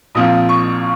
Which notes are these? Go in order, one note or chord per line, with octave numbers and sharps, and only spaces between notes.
A#1 A#2 F3 C4 D#6
C#6